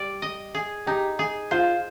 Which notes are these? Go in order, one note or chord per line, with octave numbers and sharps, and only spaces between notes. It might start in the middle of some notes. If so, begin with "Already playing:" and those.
Already playing: G3 D5
D#5
G#4
D#4 G4
G#4
F4 C5